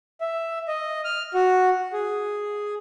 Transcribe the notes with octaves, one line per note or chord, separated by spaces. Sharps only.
E5
D#5
F6
F#4
G#4